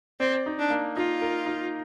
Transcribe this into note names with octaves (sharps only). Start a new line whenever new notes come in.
C4 D5
D#4
D4
A#3
D#4 F4
A#4
D#4